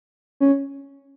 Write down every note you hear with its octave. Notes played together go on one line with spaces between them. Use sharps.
C#4